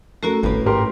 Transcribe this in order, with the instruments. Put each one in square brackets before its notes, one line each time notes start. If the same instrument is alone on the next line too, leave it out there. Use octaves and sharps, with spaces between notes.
[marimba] A3 C#4 F#4 [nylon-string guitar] A4 A#4
[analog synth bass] G#1 [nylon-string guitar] A2 B4
[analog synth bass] G#2 [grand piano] G4 A#4 C6